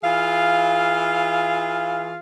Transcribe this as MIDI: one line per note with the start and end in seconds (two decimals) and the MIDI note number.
0.03 2.19 52
0.03 2.19 65
0.03 2.19 68
0.03 2.19 77